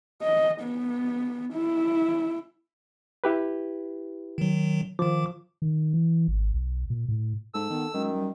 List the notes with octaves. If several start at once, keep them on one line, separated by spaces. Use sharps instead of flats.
D#5
B3
E4
E4 G4 B4
D#3 F#3
D#3 F3 D6
D#3
E3
G#1
B1
A#2
A2
G#2 A4 E6
D#3 B3
F#2 D#3 G#3
G3